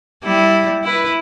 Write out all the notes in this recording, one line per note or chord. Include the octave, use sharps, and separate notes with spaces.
G3 E4
E4 B4